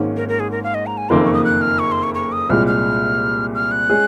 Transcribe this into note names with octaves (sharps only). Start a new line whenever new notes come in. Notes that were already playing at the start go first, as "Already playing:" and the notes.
Already playing: G#1 G#2 D#3 A#3 C#4
A#4
A#4
G#4
A#4
F5
D#5
A#5
G#5
F#1 F2 D#3 A#3 C6
C#6
D#6
F#6
F6
C#6
C6
C#6
C#6
D#6
C2 A#2 G#3 F6
F6
F6
F#6
G#3 C#4 G#4